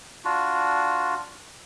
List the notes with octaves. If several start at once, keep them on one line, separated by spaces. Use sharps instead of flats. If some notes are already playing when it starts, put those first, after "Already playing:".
D4 F4 F#4